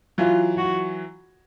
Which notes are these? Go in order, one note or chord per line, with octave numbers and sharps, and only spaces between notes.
E3 F#3 F4
F#4